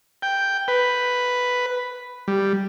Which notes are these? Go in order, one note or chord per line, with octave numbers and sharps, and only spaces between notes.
G5
B4
G3